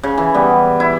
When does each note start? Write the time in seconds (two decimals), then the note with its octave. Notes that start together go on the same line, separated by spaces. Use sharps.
0.03 C#3
0.18 E3
0.34 G3 B3
0.80 E4